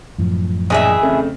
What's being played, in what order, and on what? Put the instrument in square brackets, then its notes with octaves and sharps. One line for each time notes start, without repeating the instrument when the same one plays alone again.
[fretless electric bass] F#2 A2 F3
[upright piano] A#1 D#5 [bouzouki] E3 G#4 E5
[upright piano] F2 C#3 A3